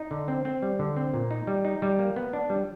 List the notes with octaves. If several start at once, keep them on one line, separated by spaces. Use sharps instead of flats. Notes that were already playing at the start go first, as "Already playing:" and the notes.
Already playing: D#4
D3
C4
C4
G3
D3
C4
A#2
D#4
G3
D#4
G3
A#3
B3
D4
G3